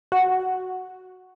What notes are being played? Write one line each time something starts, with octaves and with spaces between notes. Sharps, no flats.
F#4